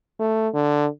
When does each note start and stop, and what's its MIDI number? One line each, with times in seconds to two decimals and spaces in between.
0.20 0.49 57
0.54 0.87 50